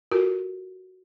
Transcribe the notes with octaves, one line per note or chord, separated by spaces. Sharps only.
F4 F#4 A4 A#4